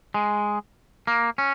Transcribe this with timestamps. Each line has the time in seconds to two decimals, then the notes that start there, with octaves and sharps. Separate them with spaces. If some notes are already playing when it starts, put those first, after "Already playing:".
0.14 G#3
1.07 A#3
1.38 C#4